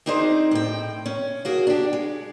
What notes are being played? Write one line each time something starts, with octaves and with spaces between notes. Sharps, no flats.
C4 D4 D#4 G#4 B4 C5
A2 G5
C#4
A#3 F#4 G#4
D4 G4
G#3